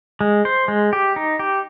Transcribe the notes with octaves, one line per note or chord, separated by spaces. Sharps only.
G#3
C5
G#3
G4
D#4
G4